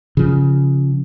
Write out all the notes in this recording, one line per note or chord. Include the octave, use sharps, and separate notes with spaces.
C#3 F3